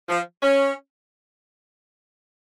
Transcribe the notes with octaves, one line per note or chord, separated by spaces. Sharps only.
F3
C#4